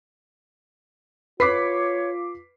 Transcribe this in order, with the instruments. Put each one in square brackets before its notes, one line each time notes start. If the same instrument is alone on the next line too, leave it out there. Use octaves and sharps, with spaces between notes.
[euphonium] F4 [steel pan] B4 [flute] C#5 [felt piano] D6 B6 C7